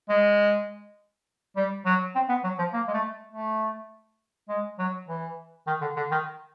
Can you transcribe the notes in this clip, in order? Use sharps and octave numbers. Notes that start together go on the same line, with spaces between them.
G#3
G3
F#3
C4
B3
F#3
F3
A#3
G#3
A3
A3
G#3
F#3
E3
D#3
D3
D3
D#3